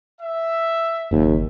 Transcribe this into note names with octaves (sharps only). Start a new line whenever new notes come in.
E5
F#1 D#2